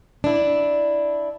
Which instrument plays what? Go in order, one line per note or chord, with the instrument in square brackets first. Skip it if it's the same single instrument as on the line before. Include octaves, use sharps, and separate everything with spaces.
[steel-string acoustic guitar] D4 E4